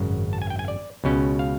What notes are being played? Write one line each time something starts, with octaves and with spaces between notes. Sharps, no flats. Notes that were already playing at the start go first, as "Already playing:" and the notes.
Already playing: G#1 F#2 C#3
A5
G#5
G5
G#5
D5
C#2 B2 G#3 C#4
F5